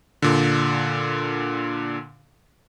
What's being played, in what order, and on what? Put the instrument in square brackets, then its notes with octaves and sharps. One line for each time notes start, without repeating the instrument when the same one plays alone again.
[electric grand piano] A#2 D3